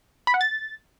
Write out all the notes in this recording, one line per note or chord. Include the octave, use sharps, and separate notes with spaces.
B5
F#5
A6